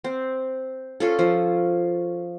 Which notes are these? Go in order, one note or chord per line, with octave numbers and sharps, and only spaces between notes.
C4
C#4 F4 A4
F3